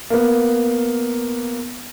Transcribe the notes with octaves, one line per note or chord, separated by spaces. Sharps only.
A#3 B3